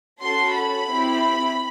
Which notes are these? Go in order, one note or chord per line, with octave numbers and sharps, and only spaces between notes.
C#4 F#4 A4 C6
B5
C4 E4 G4